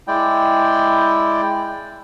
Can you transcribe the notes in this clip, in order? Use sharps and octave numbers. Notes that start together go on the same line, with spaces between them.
G#3 E4 D5 G5